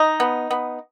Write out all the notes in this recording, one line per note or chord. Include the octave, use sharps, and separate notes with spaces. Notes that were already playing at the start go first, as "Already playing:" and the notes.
Already playing: D#4
B3
B3